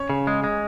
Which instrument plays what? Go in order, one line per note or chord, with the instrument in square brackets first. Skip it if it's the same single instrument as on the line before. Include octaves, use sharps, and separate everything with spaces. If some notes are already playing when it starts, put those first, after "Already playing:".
Already playing: [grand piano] C#4 C#5
[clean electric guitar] C#3
G#3
G#3